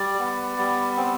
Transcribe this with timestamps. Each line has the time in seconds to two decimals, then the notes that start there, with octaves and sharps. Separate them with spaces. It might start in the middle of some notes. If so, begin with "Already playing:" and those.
Already playing: G3 D5
0.19 B3
0.58 G3
0.97 C4